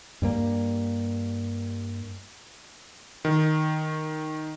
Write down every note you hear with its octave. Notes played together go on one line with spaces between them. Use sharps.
G2 G3 A#3
D#3